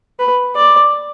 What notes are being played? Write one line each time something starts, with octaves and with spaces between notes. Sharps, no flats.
B4
D5